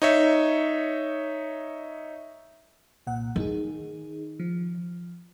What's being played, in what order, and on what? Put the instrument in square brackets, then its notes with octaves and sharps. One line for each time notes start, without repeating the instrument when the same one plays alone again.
[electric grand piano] D#4 C#5 E5
[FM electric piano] C2 A#2 F#5
[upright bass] D#3 [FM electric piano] D#4 G#4
[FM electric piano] F3